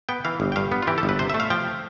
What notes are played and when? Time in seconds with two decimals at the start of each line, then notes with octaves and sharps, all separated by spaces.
0.09 B3 G5
0.25 E3 F5
0.40 G1
0.52 G5
0.56 G2 F5
0.72 B3
0.82 F4
0.87 E3 G4
0.98 A4
1.03 G1
1.09 B4
1.19 C3 C5
1.30 E5
1.34 A3
1.40 F5
1.50 F3 G5